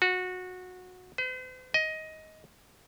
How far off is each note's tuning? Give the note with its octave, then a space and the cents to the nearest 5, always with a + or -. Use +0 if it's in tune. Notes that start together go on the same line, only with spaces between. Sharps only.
F#4 -20
C5 -45
D#5 +15